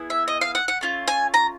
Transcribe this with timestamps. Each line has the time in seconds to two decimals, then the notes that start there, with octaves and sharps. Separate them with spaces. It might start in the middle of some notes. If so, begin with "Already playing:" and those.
Already playing: B3 E4 G#4
0.10 E5
0.28 D#5
0.41 F5
0.55 F#5
0.68 F#5
0.81 A3 C#4 F4
1.08 G#5
1.34 A#5